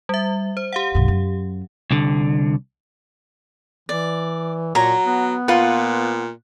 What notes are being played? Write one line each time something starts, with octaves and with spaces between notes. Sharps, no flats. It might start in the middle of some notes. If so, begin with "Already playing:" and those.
G3 E5
C5
G4 F5 F#5
B1 G2
F#2
C2 D3
E3 D5
A#2 F#3 C#5 A#5
B3
A#2 F4 B4 F#5